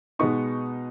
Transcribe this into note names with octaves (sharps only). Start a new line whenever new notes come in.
B2 G#3 B3 D#4 C#6